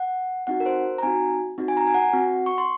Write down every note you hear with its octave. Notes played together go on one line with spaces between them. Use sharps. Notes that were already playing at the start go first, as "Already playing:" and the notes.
Already playing: F#5
C4 D#4 F#4 F#5
A#4
C5
A#5
C4 D#4 F#4 G#5
C4 D#4 F#4
G#5
A#5
G#5
F#5
C4 F#4
C#6
C6